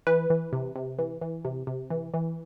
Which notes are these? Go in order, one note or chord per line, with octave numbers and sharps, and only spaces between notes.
E3 B4
E3
C3
C3
E3
E3
C3
C3
E3
E3